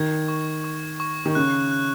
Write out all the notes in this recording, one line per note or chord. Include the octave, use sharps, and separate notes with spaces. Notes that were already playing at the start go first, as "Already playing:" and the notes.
Already playing: D#3 G#6
C#6
C#6
C#6
D#3
C#3 F#6
F#6